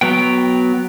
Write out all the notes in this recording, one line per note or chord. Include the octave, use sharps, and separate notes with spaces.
F#3 B3 G5